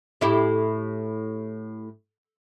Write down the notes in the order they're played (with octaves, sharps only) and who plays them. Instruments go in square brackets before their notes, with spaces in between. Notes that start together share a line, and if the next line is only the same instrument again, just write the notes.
[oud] A2 E4 G4